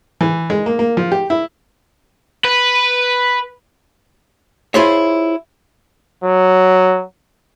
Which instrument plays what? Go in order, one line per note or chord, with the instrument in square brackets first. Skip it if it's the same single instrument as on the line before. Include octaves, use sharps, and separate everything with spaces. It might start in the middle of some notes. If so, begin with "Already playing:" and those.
[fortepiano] E3
G#3
A#3
A#3
F3
G4
E4
[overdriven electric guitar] B4
[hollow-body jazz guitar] E4 F4 G#4 C5 C#5 E5
[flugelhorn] F#3